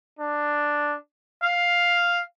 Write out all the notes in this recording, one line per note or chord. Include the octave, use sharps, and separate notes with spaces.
D4
F5